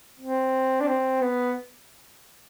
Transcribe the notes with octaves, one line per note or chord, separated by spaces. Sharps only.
C4
D4
C4
B3